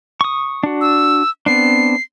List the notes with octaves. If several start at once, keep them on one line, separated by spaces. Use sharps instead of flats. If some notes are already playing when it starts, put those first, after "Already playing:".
C#6 D#6
D4 F#4
E6
B3 C4 D4 C7